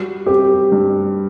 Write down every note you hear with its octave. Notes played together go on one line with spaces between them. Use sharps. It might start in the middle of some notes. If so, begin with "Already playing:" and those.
Already playing: G3 F#4
C4 G4
G2